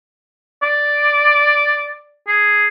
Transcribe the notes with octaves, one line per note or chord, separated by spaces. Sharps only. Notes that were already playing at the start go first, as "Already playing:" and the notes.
D5
G#4